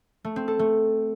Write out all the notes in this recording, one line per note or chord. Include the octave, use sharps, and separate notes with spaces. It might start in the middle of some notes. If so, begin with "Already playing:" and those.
A3
C4
A4
A3